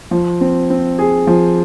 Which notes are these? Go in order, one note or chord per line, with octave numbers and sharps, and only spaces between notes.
F3
C4
C4
G#4
F3